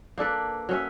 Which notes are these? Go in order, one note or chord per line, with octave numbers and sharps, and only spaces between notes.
A#3 D4 A4 B4
F#3 C#4 E5